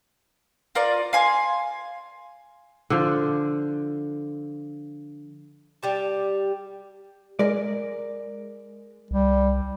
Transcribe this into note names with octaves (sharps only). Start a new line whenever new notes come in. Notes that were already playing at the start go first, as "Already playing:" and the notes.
F4 A#4 D5
F5 G#5 C6
D3 F3
G3 G4 A5
G#3 A#4 D5
C2 G3